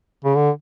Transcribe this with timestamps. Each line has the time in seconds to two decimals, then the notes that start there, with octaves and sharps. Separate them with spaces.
0.25 C#3
0.36 D3